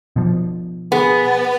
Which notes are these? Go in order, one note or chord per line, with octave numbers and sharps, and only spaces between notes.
B2 F3
B3 G#4